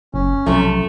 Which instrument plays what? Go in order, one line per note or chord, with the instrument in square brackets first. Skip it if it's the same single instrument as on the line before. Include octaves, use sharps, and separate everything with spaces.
[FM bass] F#1 [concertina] C#4
[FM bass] B1 [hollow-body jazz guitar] F#2 C3 F3 [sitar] A3